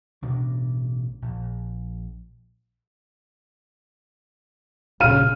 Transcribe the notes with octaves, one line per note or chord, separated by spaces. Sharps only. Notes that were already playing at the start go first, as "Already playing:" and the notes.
A1 B2 D4
A#1
A#1 C#3 F5 F6 D#7